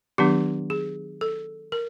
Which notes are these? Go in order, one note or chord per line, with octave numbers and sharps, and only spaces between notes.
D#3 F#3 B3 D4 G4
G#4
A4
A#4